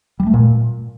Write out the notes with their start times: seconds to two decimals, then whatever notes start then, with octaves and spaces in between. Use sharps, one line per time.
0.20 G3
0.27 A3
0.34 A#2